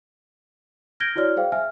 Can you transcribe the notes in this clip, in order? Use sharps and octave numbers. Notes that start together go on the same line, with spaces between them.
F6 G6 G#6 A#6 D7 G7
E4 F#4 C#5 D5 F6
G#4 C5 F5 G5
E5 G#5 F6